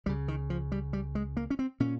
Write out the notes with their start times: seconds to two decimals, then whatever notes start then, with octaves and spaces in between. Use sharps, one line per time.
0.06 C#2 G3
0.09 C#3
0.28 D#3
0.50 F3
0.72 G3
0.93 G3
1.15 G#3
1.37 A#3
1.50 C#4
1.59 C4
1.80 A#2 C#4